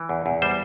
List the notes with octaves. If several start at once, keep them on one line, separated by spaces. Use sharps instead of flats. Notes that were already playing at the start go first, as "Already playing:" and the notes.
Already playing: E3
E2
E2
G3 C5